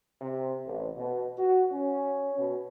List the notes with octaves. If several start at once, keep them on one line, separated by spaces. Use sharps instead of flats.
C3
A1
B2
F#4
C#4
B2